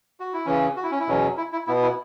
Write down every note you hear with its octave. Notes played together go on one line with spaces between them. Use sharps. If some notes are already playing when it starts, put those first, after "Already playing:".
F#4
E4
C#3 E3 C#4
F#4
E4
C#4
E4
E2 B2 F#3 C#4
E4
E4
B2 B3 E4
E4